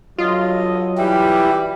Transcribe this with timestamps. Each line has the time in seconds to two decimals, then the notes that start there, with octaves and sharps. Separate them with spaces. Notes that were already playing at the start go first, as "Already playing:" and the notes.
0.18 G2 F#3 F4 A4 D#5
0.98 E3 G3 E4 G4